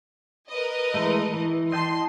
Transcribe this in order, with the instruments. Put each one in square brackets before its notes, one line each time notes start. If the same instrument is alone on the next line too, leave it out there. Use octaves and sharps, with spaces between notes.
[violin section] A#4 B4 D#5
[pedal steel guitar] E3 G#3 A3
E3
[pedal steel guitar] D#5 G5 A5 [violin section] C6